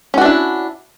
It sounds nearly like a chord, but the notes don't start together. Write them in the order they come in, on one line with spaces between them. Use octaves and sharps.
C#4 F#4 D4 E4